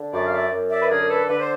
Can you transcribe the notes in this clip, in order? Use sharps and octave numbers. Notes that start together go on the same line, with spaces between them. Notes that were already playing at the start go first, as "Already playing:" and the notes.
Already playing: D3
F#2 D5 E5
F5
D5 E5
F#2
D5 E5
B4
D3 G#4 A#4
A4 B4
D3 B4
C5